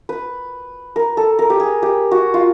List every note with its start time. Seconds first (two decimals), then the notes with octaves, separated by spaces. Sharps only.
0.09 B4
0.96 A#4
1.17 A4
1.39 A#4
1.50 G4
1.60 G#4
1.82 G4
2.11 F#4
2.34 F4